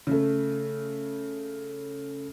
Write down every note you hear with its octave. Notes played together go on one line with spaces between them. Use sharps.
C#3 A3